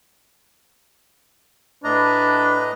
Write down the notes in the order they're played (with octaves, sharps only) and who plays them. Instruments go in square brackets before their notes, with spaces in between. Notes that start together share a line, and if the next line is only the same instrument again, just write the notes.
[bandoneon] A2 D#5 A#5 [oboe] D4 [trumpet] B4